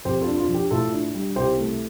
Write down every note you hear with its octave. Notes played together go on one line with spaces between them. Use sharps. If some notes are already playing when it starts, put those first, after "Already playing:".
F2 G4 C5
F4 A4
D4
F4
F3
G4
A2 F4 A4
D4
G3
C2 G4 C5
A3